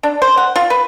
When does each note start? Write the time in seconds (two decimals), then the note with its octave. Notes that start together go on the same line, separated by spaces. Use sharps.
0.03 D4
0.22 C5
0.37 F#5
0.56 F4
0.70 B4